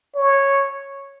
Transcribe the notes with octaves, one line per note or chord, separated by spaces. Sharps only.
C#5